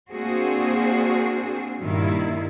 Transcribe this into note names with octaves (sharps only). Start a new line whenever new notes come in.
A#3 C4 D4 F#4 G#4 C5
G2 A#2 D#3 E4